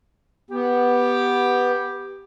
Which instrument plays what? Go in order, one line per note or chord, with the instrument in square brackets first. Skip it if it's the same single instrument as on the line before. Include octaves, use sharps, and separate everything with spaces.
[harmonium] B3 [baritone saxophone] G4